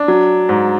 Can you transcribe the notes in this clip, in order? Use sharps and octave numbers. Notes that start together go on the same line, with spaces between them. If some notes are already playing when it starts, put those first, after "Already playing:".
Already playing: D4
F#3
G#2